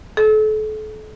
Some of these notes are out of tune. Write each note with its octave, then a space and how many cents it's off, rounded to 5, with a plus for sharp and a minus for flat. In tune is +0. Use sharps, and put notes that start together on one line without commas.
A4 -35